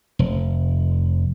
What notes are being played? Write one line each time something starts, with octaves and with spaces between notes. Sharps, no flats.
F1